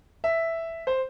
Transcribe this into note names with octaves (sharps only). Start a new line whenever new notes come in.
E5
C5